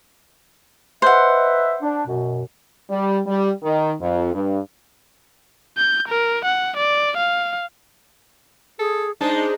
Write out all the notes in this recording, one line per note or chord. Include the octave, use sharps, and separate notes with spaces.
B4 C5 D#5 E5 F#5
D4
F#2 B2
G3
G3
D#3
F2
G2
G6
A#4
F#5
D5
F5
G#4 A4
G#3 D4 D#4 C5 A5